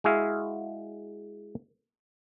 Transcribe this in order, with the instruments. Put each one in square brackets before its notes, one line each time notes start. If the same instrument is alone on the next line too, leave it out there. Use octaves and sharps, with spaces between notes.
[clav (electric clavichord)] G#3 E4 F#4 G#4 E5 F5